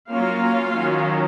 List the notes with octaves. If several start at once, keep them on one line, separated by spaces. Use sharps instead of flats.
F#3 A#3 C#4 F4 F5
D#3 F#3 C#4